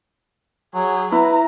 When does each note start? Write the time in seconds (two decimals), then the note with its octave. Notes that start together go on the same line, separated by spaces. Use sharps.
0.74 F#3 G#4
1.12 E4 B4 A#5